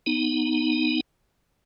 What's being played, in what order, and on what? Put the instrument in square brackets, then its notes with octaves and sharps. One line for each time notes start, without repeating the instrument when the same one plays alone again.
[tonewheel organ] B3 D#4